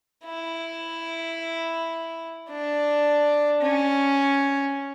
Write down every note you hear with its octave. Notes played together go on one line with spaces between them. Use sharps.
E4
D4
C#4